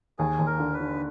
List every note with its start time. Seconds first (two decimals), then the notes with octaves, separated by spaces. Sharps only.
0.19 D#2 G#4
0.39 D#2
0.46 A#4
0.59 D3
0.73 B4
0.80 D3